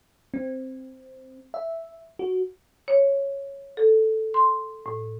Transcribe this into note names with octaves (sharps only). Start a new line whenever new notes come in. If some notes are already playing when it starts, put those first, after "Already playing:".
C4
E5
F#4
C#5
A4
C6
A2